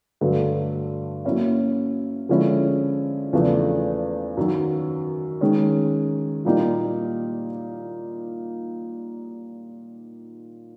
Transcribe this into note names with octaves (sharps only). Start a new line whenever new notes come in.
G2 D3 F#3 A3
F#3 A#3 C#4 E4
D3 F3 G#3 C#4 E4
E2 C#3 F3 A3 D4
F#2 D#3 F#3
D#3 G#3 C#4
A#2 G3 A#3 D#4 G4